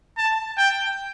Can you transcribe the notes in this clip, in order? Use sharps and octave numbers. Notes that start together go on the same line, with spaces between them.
A5
G5